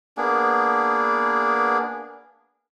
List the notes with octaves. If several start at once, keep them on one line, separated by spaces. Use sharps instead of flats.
A#3 B3 D4 G#4